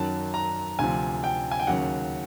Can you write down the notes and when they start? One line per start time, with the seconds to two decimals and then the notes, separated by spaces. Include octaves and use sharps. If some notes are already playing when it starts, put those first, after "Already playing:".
Already playing: F#2 D#3 F#3 A5
0.34 A#5
0.79 D2 C3 F3 G#5
1.24 G5
1.51 G#5
1.60 G5
1.67 D#2 C#3 F#3 F#5